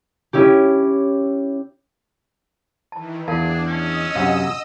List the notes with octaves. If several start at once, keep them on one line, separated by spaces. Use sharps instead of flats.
C#4 E4 G4
D#3 E3 A5
E2 D4 G#4 A#4 F5 A5
C#4 D#5 D#6 E6
F#2 C3 D4 F5 F#5